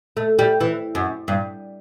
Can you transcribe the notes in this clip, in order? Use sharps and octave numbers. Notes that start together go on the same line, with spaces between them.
A3
G3
E3
F#2
G2